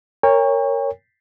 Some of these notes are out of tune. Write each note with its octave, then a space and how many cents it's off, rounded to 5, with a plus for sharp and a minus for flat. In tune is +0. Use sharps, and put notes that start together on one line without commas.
A#4 -10 C#5 +0 G5 +45